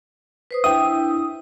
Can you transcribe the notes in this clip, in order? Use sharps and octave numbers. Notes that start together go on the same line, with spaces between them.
B4 C5 D#6
D4 E4 E5 G5 D#6